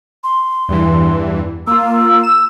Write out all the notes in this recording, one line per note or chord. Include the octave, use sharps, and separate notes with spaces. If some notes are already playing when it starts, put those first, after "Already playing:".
C6
E2 G2 E3
A#3 F4 E6
E7